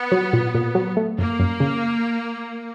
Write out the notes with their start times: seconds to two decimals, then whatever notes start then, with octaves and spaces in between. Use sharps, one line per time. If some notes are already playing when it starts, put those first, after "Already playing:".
Already playing: B3
0.12 F#3
0.33 A#2
0.55 A#2
0.75 F#3
0.97 A3
1.18 F#2 A#3
1.40 F#2
1.60 C#3